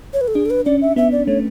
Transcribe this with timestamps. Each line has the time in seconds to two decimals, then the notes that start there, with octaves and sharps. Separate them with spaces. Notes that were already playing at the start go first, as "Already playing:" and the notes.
0.13 C#5
0.21 B4
0.28 A4
0.35 D4 G#4
0.46 A4
0.50 B4
0.66 C#4 D5
0.81 E5
0.96 B3 E5
1.12 D5
1.27 A3 C#5